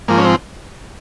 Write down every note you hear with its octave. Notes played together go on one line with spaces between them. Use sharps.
G#2 F3 A#3
C#4
C4